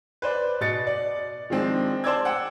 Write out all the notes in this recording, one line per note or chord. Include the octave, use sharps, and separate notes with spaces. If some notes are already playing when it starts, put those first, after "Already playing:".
B4 C5 D5
B2 D#5 A6 C#7
D5
D#3 F3 G#3 C4 D4
C5 D5 A5 D6 E6 G#6
F#5 G5 D6 E6